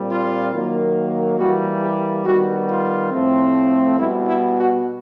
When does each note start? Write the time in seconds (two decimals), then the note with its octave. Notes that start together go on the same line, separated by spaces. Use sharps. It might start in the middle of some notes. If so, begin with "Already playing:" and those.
Already playing: A#2 G3 C4
0.08 F4
0.52 D#3 F#3 A#3
1.38 E3 G3 A#3 F#4
1.82 G4
2.24 D#3 G3 B3 F#4
2.69 F4
3.11 A2 F3 A3 C4
3.98 B2 G3 B3 E4
4.27 E4
4.57 F#4